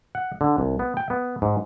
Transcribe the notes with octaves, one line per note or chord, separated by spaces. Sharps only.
F#5
D3
C2
B3
G5
B3
G#2